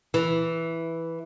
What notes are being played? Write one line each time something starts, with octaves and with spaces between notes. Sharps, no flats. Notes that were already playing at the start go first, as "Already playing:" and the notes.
E3